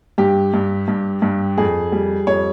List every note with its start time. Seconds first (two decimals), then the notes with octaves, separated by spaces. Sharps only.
0.18 G2 G4
0.54 G2
0.88 G2
1.22 G2
1.58 F2 G#4
1.92 G3
2.27 F2 C#5